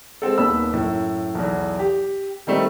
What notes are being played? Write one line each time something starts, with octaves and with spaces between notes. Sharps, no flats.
G#3 C4 A4
D#1 D#2 B3 B5 E6
F#2 A2
B1 E2
G4
D#3 G3 A3 C4 D#4